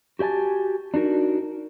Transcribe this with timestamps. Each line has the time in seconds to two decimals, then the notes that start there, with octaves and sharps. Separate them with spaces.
0.19 F#4 G4 D5 G#5 A5
0.94 D4 D#4 F#4 A#4